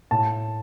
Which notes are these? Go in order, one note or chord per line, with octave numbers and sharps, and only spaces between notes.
A2 A5